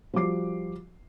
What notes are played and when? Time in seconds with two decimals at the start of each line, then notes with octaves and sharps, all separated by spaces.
0.14 F3 G3 F#4 D6 C7